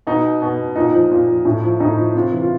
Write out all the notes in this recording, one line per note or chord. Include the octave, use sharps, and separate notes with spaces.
B2 D#4
B2
A#2 D#4
F3
A#2
F3
A2
F3
A2 D#4
F3
C3 F4
E3
F4